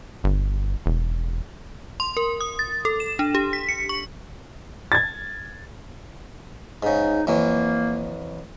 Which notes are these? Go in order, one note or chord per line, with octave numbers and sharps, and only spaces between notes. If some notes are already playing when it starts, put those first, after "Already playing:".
G1
E1
C6
A#4
D#6
A6
A4
E7
D4
G4
B6
C#7
C#6
G#6 A6
G#2 C#3 D#4
F2 E3 F#3 A#3